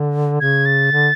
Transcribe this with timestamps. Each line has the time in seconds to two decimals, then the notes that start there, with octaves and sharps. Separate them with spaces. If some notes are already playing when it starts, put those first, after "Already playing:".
Already playing: D3
0.40 C#3 G#6
0.66 A6
0.91 D3